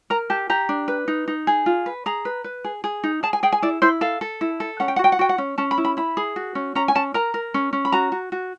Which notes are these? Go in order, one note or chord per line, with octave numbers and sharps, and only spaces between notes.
A#4 A#5
G4 A5
G4 A#5
D4
B4
D#4
D#4
G#4
F4
B4
G#4 A#5
B4
B4
G#4
G#4
D#4
G#4 A5
G#5
G#4 G5
G#5
E4 D5
E4 C5
A4 F5
A4
E4
A4
C#4 F#5
G5
F#5
F#4
G5
F#5
F#4 G5
F#5
C#4
C#4 A5
B5
E4
B5
E4 B5
G#4
F#4
C#4
C#4 A#5
G#5
C#4 A5
A#4 A#5
A#4
C#4
C#4
B5
F#4 A#5
F#4
F#4